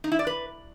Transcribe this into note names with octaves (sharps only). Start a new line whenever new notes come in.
D#4
E4
D5
B4